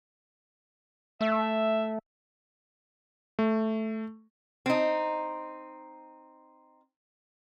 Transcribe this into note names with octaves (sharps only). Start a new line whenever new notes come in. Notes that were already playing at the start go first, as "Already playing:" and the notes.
A3 E5
A3
C4 D#4